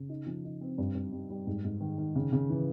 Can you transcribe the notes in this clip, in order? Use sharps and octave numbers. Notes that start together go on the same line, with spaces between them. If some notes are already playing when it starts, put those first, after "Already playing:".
Already playing: C#3
D#4
F3
D#4
C4
G2
G2
G3
G3
G#2
G#2
D#3
D#3
C#3
C#3
E3